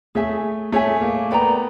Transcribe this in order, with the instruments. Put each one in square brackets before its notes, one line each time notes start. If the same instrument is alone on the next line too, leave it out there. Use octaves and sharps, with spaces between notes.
[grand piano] A3 [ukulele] G#4 C#5 E5 G#5
[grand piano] A3 [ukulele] G#4 C#5 E5 G#5
[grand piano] A#3
[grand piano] B3 [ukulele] A4 D5 G5 A#5